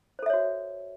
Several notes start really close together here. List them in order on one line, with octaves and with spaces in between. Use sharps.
C5 A4 E5 C#5 F#4